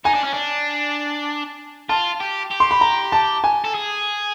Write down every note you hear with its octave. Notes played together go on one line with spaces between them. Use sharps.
D#4 G#5
D4
C#4
D4
F4 A5
G4
G4
C6
B5
A#5
A5
G#5
A4
G#4